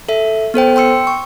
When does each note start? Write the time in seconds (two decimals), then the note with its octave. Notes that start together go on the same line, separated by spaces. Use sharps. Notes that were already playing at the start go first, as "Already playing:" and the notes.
0.09 A4 E5
0.54 B3 A4 C5 G5
0.76 G5 C6 E6 C#7
1.07 C#6